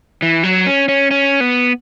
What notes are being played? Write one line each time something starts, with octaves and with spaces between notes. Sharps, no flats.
E3
F#3
C#4
C#4
C#4
B3